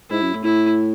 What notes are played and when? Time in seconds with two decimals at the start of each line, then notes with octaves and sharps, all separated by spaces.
0.10 G#2 E4
0.21 F#2
0.34 A2
0.44 A2 E4